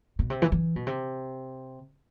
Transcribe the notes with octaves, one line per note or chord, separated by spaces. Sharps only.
B2
C3
E3
E3
B2
C3